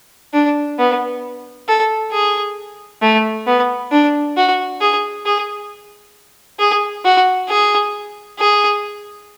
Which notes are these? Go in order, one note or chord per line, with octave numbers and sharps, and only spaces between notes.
D4
B3
A4
G#4
A3
B3
D4
F#4
G#4
G#4
G#4
F#4
G#4
G#4